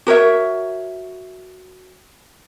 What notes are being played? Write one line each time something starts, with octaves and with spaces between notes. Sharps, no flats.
F#4 A#4 C#5 E5